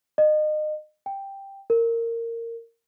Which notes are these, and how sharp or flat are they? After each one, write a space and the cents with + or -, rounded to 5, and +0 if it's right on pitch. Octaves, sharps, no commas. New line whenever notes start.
D#5 -30
G5 +5
A#4 -20